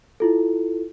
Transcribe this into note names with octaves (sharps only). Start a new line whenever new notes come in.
E4 F4 A4